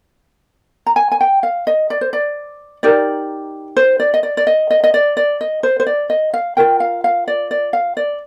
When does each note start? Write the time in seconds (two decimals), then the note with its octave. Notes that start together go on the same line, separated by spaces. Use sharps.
0.87 A#5
0.96 G#5
1.12 G#5
1.21 G5
1.43 F5
1.67 D#5
1.90 D5
2.01 C5
2.13 D5
2.83 D#4 G4 A#4 D5
3.77 C5
4.00 D5
4.14 D#5
4.23 D5
4.37 D5
4.47 D#5
4.71 D#5
4.84 D#5
4.94 D5
5.17 D5
5.41 D#5
5.63 C5
5.80 C5
5.87 D5
6.10 D#5
6.34 F5
6.57 F4 A#4 G5
6.80 F5
7.04 F5
7.28 D5
7.51 D5
7.73 F5
7.97 D5